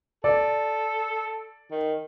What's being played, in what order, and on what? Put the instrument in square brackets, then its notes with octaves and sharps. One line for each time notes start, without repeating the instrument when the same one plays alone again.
[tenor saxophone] A4 [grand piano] D5
[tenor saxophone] D#3